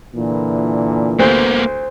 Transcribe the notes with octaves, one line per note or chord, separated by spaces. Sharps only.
A#2 D3 E3
D2 A#3 B3 C5